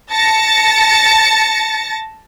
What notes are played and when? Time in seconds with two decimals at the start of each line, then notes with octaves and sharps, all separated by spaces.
0.13 A5 A6 A#6 C#7